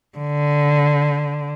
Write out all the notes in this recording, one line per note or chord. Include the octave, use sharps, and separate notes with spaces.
D3